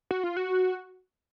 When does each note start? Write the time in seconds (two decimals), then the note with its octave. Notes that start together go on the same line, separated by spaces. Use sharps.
0.11 F#4
0.23 F4
0.37 F#4